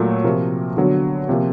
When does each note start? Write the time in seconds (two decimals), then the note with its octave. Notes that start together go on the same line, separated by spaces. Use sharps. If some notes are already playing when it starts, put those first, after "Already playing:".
Already playing: A#2 F#3 A3
0.24 C3 F3 A#3 A#4
0.77 D3 F#3 B3
1.29 C3 F3 A#3